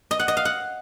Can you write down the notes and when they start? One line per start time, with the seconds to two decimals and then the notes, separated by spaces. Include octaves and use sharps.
0.11 D#5
0.19 F#5
0.28 D#5
0.37 F5
0.45 F#5